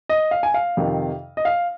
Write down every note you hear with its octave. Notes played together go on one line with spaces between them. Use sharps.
D#5
F5
G#5
F5
F2 C3 D#3
D#5
F5